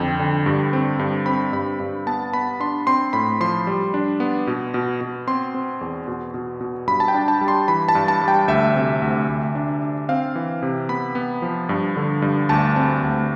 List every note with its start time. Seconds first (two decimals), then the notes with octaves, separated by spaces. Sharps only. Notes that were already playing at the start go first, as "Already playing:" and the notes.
Already playing: F2 D3 G5
0.19 D3
0.46 G2
0.73 C4
0.99 G2
1.26 C4 B5
1.53 G2 B5
1.80 G2
2.07 B3 A5
2.33 B3 B5
2.60 D4 C6
2.87 C4 C6
3.13 A2 B5
3.40 F3 C6
3.67 G3
3.94 D4
4.20 B3
4.47 B2
4.74 B2
5.01 B2
5.27 C4 C6
5.54 C4
5.81 E2
6.08 B2
6.34 B2
6.61 B2
6.87 G2 B5
7.00 A5
7.08 G5
7.14 D4
7.28 A5
7.41 G3
7.48 C6
7.68 E3 B5
7.89 A5
7.95 G2
8.08 A5
8.22 G3
8.28 G5
8.48 D2 E5
8.75 C3
9.02 D2
9.28 D2
9.55 D4
9.82 D4
10.09 C4 F5
10.36 E3
10.63 C3
10.89 B3 B5
11.15 B3
11.42 F3
11.69 G2
11.96 D3
12.22 G2
12.49 D2 A5
12.76 C4
13.03 D2